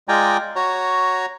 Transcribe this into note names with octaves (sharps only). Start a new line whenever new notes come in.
G#3 F4 D5 G5 G#5 A#5
F#4 C#5 A#5